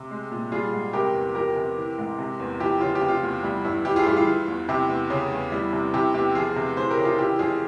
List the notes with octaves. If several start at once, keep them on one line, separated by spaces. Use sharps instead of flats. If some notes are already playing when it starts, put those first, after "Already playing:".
Already playing: C3
G#3
A#2
G3 F4 G#4
G#2
C3 G4 A#4
E2
F3 G4 A#4
C3
E3
G#2
C3
E2
F3 E4 G4
C#3 F4
G4
C3
F4
E2
G3 E4
G2 E4
E3 E4 G4
F4 G#4
G2 E4 G4
F4
E3
E2
C3 E4 G4
E2
C#3
E2
G3 E4
C3
C3 E4 G4
E2 E4 G4
F3 F4 G#4
C3
E3 G#4 C5
G4 A#4
C#3
F4
E3 E4 G4
F2 F4 G#4